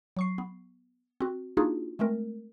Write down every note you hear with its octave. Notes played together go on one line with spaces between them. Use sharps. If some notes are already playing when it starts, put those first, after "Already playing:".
F#3 C#6 C7
B3
C4 F#4
A#3 D4 D#4 F4 F#4 G#4
G#3 A3 C4 A#4